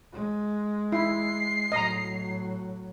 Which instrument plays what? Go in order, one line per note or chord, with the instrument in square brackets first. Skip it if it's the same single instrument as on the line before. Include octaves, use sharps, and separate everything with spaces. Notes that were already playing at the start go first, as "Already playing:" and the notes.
[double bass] G#3
[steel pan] E4 [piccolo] C7
[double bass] A2 F#3 [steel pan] D#5 A#5